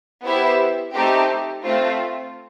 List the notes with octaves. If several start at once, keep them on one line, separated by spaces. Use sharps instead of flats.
B3 E4 G4 C5 E5
A3 C4 D#4 G4
A3 C4 F4